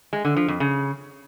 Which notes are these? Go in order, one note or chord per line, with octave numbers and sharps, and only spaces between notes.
G#3
D3
F3
F2
C#3